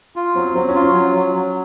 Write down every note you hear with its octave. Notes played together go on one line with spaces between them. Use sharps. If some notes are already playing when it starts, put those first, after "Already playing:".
F4
F#3 C4
F#3 C4
C#4
F4
C#4
F#3
F#3
F#3